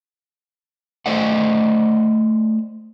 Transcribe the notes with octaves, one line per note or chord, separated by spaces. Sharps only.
A3 C5 D5 D#5 F#5